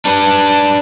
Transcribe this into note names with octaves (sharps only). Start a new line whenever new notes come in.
D4 B4